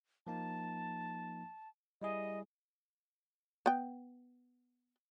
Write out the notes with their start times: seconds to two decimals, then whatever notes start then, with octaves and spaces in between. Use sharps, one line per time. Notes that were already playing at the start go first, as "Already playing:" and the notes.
0.27 F3 A#3 D#4 A5
2.02 G3 E4 G#4 D#5
3.66 B3 G5